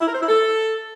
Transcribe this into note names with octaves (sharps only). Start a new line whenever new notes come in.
E4
A#4
C5
E4
A4